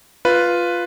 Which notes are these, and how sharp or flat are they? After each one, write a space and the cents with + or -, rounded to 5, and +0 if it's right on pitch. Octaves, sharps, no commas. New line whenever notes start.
F4 +0 B4 +0